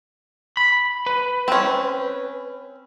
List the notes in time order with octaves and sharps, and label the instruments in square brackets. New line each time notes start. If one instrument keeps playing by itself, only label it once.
[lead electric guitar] B5
B4
[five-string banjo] C4 C#4